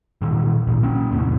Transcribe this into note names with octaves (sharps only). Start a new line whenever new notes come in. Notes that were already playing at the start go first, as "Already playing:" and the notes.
A#2 D#3 E3
D#1 A1 A#2
A#3 C#4
E2 A2 C3